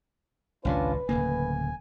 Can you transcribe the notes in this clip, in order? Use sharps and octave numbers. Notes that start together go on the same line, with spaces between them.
G#1 C#2 A#2 C#4 D4 F4 B4
D1 C#3 A#3 G#5